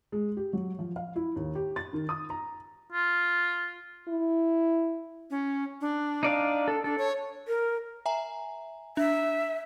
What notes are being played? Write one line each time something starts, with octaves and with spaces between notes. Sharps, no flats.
G#3
G4
F#3
F3
F5
E4
D#2
G4
A6
D#3
D#6
A#5
F4
E4
C#4
D4
D#4 D5 F5
A4
D4 A4
C#5
A#4
E5 G#5 A#5
D4 E5